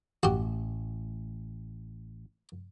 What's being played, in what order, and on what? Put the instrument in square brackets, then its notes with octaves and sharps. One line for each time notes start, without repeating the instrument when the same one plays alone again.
[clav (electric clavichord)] A1 [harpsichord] F#4 G4